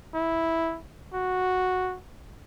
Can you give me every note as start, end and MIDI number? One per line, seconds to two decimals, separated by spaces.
0.15 0.78 64
1.14 1.97 66